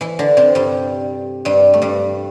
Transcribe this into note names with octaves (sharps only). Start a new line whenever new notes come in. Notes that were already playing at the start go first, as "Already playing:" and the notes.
E3 E4
D3 D4
C3 C4
G2 G3
G2 G3
A3
G2 G3